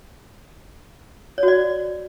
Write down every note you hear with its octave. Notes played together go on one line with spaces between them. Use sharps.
C#5
F#4
D5